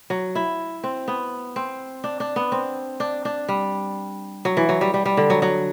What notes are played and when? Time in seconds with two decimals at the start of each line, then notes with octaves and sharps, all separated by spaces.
0.10 F#3
0.35 E4
0.84 C4
1.08 B3
1.56 C4
2.04 D4
2.20 D4
2.36 B3
2.52 C4
3.00 D4
3.25 D4
3.49 G3
4.45 F#3
4.57 E3
4.69 F#3
4.81 G3
4.94 G3
5.06 G3
5.17 D3
5.30 F#3
5.42 F#3